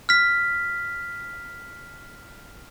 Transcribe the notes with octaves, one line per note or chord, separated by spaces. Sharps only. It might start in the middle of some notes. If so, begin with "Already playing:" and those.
F6 B6